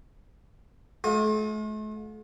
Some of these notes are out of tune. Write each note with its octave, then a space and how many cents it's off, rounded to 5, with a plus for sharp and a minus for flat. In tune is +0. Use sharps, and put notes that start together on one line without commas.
A3 -45 F4 +45